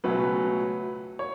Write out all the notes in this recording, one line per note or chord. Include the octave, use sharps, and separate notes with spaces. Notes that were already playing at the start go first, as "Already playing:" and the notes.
C#2 B2 F#3 A3 C#4 B4
C#5